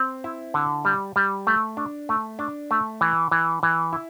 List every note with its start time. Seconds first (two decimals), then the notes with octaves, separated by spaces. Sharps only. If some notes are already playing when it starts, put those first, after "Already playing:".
Already playing: C4
0.24 E4
0.54 D3
0.85 G3
1.16 G3
1.47 A3
1.77 D4
2.09 A3
2.39 D4
2.71 A3
3.01 E3
3.31 E3
3.63 E3
3.93 E4